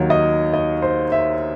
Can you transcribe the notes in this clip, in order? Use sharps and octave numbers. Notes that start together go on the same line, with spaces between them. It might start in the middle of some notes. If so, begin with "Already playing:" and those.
Already playing: D#2 D#3 F#3 C#5
D#5
D#5
C5
E5